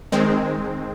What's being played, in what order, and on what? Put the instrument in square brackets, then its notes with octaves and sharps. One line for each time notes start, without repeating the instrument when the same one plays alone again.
[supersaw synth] D#3 G#3 C4